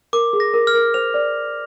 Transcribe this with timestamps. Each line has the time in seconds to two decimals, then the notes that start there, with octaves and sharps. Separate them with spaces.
0.13 A#4 D6
0.33 G#4
0.40 A#6
0.53 A#4
0.67 F6
0.74 A#4
0.94 C5 F7
1.14 D5